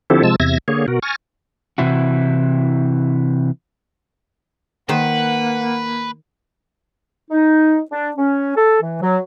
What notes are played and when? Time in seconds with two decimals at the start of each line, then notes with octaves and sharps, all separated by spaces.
0.10 D3 F3 C4 E4 G4 A4
0.24 C3 F3 G#3 A5 E6
0.40 E2 C3 E5 G#6 A#6
0.68 D3 A#3 G#4 C#5
0.88 B2 F#4 A#4
1.02 G#5 C#6 F6 A6 A#6
1.78 C3 E3 E4 F#4
4.89 D#3 A#3 B4 C5 F#5
7.31 D#4
7.91 D4
8.17 C#4
8.56 A4
8.82 E3
9.02 F#3